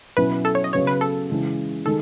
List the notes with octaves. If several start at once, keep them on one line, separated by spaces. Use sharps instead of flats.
B2 F#3 C#4 E4 B4
A4
C#5
D#5
C#3 F#3 B3 C#5
B4
A4
C#3 E3 G#3
D#3 G#3 A4